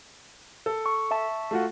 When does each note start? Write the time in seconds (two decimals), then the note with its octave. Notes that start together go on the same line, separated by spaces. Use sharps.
0.66 A4
0.86 C#6
1.11 E5 A5 C#6
1.51 A3 F4 F#4